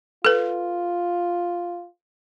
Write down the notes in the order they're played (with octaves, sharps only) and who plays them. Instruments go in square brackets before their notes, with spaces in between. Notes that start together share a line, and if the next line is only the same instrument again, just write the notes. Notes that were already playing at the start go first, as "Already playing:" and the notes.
[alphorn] F4 [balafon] A4 B4